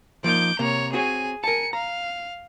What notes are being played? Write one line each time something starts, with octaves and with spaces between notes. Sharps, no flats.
F3 A#3 D#4 D6 G6
C3 A#3 C#5 A#5
C4 F#4 G#4 C#5 G#5
A#4 G#5 A5 C#7
F5 A#5